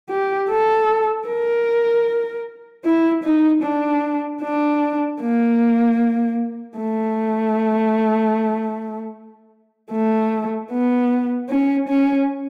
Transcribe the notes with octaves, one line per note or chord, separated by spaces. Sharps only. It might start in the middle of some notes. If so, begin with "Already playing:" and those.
G4
A4
A#4
E4
D#4
D4
D4
A#3
A3
A3
B3
C#4
C#4